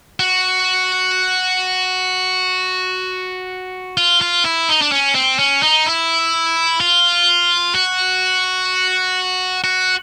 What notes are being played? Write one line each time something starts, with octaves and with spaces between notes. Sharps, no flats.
F#4
F4
F4
E4
D#4
D4
C#4
C4
C#4
D#4
E4
F4
F#4
F#4